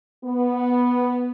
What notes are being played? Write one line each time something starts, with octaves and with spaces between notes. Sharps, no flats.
B3